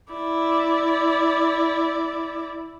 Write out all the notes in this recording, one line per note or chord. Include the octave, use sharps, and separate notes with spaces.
E4 D5